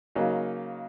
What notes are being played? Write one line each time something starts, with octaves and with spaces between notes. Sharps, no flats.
C#3 F#3 A#3 D#4